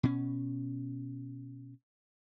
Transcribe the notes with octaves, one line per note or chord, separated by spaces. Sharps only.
B2 C#4